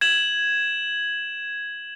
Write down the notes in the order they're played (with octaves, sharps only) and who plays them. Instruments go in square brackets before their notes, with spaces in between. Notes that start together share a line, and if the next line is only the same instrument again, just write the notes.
[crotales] G#6 E7 F#7